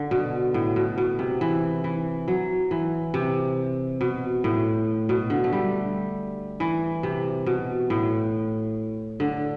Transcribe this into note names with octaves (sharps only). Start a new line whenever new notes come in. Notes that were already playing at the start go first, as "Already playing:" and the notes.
Already playing: D3
B2
A2
B2
B2
C3
E3
E3
F#3
E3
C3
B2
A2
B2
D3
A3
G3
E3
C3
B2
A2
D3